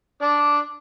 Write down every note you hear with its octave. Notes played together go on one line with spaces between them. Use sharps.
D4 D5